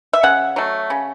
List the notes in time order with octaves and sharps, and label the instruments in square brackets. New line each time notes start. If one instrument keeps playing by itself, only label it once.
[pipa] E5
C#3 F#5
F#3 A3
C#3